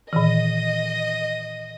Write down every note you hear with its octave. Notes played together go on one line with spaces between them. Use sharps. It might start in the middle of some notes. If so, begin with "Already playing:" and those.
A#2 D#3 E3 D#5